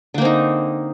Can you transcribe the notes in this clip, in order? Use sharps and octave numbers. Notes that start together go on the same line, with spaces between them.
D3 A#3 C4 D#4